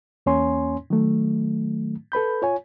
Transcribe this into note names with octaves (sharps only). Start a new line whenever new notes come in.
E2 A#3 C#4 C#5 G#5 C6
D#3 F#3 A3
A4 B4 B5 G6
F4 C#5 G#5